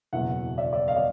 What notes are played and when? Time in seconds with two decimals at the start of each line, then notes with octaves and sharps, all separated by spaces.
0.13 F#1 E2 B2 E5 F#5
0.58 D5 E5
0.73 D5 E5
0.88 D#5 F5
0.97 D5